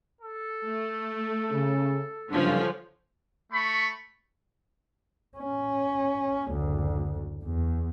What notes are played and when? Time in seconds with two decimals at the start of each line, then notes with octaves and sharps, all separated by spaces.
0.21 A4
0.66 A3
1.51 C#3
2.31 F#1 G2 D3 F3 C#4
3.52 A3 B5 C#6
5.38 C#4
6.52 F#1 D2
7.44 E2